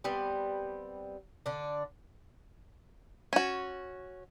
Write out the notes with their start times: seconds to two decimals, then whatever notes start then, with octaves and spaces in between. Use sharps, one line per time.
0.04 G3 B3 C4
1.46 D3 D4
3.33 C#4 F#4